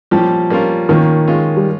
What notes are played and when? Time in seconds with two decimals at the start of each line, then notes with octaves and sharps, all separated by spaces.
0.11 A#2 F3 G3 C#4 G4
0.50 G3 A#3 C#4 F4 A#4
0.89 A#2 D#3 F3 A#3 C#4
1.28 G#3 C#4 F4
1.57 G3